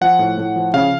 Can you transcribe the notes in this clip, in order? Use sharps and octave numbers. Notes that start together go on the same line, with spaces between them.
F3 F#5
A2
A2
F3
C#3 F5